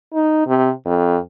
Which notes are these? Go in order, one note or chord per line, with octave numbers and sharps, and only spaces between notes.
D#4
C3
F2